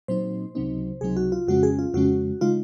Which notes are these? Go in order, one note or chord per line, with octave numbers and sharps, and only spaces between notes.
A#2 F#3 C4 D#4 C5
C#2 C3 F#3 C4 D#4
C#2 C3 F#3 C4 D#4 G#4
F#4
F4
F2 C#3 G#3 C#4 F#4
G#4
F4
F2 C#3 G#3 C#4 F#4
C#3 G#3 D#4 F4